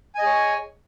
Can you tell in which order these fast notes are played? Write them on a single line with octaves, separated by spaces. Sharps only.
G#5 D#5 G#4 C#5